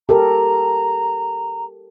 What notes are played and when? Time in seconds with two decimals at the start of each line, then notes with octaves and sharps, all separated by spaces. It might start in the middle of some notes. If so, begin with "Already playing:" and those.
0.09 G4 A4 A#4 A#5